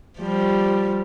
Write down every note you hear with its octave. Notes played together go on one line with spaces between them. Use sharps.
F3 G3